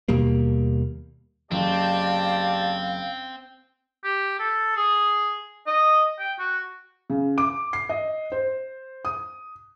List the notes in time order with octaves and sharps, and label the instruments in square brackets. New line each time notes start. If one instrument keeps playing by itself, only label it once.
[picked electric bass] D#2 B2 G3 A#3
[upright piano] F#1 [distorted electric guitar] C4 [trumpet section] G4 D5 A5 [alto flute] F5
[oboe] G4
A4
G#4
D#5
G5
F#4
[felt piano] C#3
D6
C7
D#5
C5
D#6